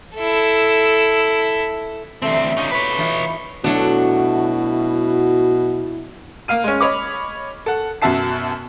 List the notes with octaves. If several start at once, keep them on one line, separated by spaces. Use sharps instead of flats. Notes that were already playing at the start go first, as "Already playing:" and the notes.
E4 A4
D2 C3 E3 A3 C4
C#4 D#4 F4
B4 C#5
E3 D#4 F4
B2 F#3 A3 D4 E4 F#4
A#3 F5 F6 D#7
G#3 C#4
C#5 D#5 B5 D6
A4 F#5
F#2 B2 F#4 E5 A5 C7